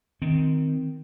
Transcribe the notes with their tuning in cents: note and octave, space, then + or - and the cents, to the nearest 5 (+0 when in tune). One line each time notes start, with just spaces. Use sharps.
D#3 +5 C4 -15